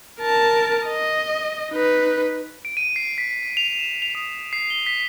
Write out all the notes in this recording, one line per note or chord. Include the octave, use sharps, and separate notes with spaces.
A#4 A5
D#5
D#4 B4
D7
D#7
C7
B6
F7
E7
F7
D#6
C7
G7
B6